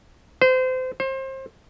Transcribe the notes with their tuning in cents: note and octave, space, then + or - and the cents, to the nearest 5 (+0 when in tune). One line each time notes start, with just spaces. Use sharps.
C5 -30
C5 +30